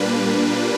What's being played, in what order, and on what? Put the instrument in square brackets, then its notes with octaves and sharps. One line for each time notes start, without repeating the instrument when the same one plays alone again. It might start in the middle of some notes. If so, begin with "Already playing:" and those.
Already playing: [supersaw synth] A#2 G3 A#3 D4 B4